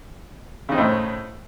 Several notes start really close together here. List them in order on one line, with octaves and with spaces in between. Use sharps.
C#3 D#4 C4 A2